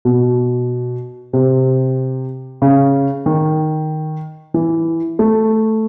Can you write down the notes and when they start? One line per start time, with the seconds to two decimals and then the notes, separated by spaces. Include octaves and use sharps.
0.05 B2
1.33 C3
2.62 C#3
3.26 D#3
4.54 E3
5.19 A3